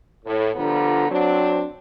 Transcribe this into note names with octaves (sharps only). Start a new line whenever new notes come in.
A2
D3 F3 G3 B3 F4 A#5
F#3 C4 D4